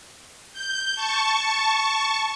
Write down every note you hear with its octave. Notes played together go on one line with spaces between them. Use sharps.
G6
A5 C#6